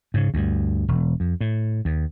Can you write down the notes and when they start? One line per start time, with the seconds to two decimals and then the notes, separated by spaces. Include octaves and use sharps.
0.14 G#2 C#3
0.34 D2 G2
0.88 E1
1.20 F2
1.41 A2
1.85 D#2